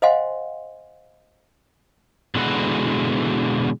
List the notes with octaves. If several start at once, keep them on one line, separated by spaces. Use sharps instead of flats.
C5 D#5 F5 F#5 G#5 C6
B2 D3 E3 G#3 F#4 B4